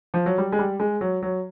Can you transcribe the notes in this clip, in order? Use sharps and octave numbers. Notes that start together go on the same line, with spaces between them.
F3
F#3
G3
G#3
G3
G#3
F#3
F#3